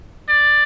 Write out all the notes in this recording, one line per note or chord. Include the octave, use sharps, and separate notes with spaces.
D5